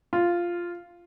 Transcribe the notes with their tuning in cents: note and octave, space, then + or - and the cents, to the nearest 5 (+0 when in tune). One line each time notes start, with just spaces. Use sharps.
F4 -5